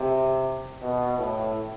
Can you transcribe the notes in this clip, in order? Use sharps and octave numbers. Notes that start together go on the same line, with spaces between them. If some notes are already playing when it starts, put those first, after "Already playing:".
Already playing: C3
B2
A2